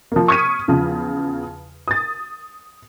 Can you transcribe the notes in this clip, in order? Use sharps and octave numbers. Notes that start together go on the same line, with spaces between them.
F3 A#3
C#6 D#6 F6 G#6 B6 D#7
E2 C#3 F3
D#6 A6